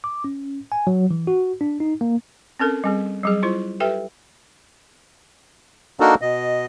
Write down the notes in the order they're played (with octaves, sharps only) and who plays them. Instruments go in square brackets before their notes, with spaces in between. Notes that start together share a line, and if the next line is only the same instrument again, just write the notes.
[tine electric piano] D6
C#4
G#5
F#3
E3
F#4
D4
D#4
A#3
[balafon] C4 C#4 A4 A#4
G3 C4 G#4
F#3 G3 G#4
E4 F4 C5
G4 A4 B4 E5 G5
[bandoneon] A#3 D4 D#4 F#4 A4 A#4
B2 D#5